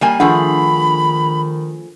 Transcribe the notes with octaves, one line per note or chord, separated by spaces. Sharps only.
G3 A#3 G#5
D#3 F3 A3 D4 G#4 F#5 B5